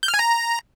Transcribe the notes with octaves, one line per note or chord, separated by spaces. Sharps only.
G6
F6
G#5
A#5